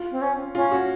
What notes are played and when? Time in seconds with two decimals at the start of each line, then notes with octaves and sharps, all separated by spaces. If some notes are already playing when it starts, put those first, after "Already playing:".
Already playing: F4
0.11 C4
0.21 C#4
0.55 C#4 F4
0.72 F#4